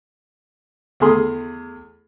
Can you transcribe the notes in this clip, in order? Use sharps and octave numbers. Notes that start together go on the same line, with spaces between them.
E2 A3 G#4 C6